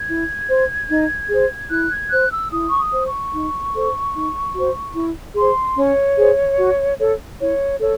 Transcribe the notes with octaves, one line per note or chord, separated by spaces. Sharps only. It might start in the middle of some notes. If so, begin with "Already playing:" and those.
Already playing: G#6
E4
C5
D#4
G#4 C5
E4 F#6
G#6
C5 F#6
E6
E4 D#6
C#6
D#6
C5
C#6
D#4
A4 C5
D#4
F#4 C5
E4
G#4 C5 C6
C#4 C#5
G#4 C5
F#4
A4 C#5
E4 C#5
A4 C#5